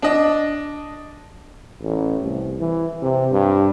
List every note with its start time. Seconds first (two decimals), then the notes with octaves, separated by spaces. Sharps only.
0.02 D4 D#5
1.82 A1
2.22 C2
2.60 E3
3.02 C3
3.32 G2